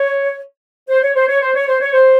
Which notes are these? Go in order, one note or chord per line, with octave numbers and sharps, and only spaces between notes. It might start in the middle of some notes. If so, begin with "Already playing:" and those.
Already playing: C#5
C5
C#5
C5
C#5
C5
C#5
C5
C#5
C5